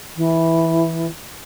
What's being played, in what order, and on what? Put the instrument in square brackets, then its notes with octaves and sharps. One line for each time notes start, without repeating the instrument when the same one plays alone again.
[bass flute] E3